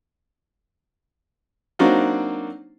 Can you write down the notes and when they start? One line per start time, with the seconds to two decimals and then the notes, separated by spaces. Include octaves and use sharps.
1.79 F#3 A#3 C4 D4 D#4 F#4